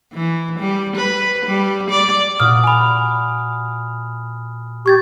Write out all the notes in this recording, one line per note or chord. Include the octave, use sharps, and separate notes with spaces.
E3
G3
B4
G3
D5
A#2 F#4 D#6 F6
G#5 B5
G4 C#6 G#6 A6